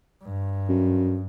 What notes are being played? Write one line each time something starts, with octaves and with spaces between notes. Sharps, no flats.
G2
F#2